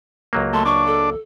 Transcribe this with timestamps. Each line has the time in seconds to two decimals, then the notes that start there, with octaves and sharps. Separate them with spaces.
0.33 C#2 F#3 A#3
0.53 A3 C6
0.65 D4 C#6
0.86 A4